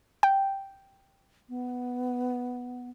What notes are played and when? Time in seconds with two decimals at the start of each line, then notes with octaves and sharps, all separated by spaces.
0.23 G5
1.49 B3